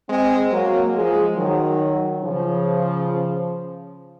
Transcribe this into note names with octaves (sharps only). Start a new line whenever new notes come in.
G#3 C4
F#3 A#3
F3 G#3
D#3 F#3
C#3 F3